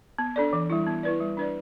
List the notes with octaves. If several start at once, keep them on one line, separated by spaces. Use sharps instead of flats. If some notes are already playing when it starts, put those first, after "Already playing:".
B3
D4 A4 D5
E3
G3 E4
B3
E4 B4 D5
G3
D4 B4 D5